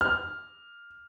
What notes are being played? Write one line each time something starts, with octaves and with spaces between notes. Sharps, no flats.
F6